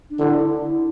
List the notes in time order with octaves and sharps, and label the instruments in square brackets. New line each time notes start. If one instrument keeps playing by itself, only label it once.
[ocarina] D4
[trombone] D3 [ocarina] E4
[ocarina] E4